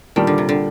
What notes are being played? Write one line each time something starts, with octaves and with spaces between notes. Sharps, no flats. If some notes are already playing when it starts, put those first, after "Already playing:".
A#2 D#3 G3 D4 G4
D3
C3
D3